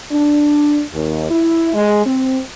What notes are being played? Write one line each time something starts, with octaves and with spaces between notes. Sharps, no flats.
D4
D#2
E4
G#3
C4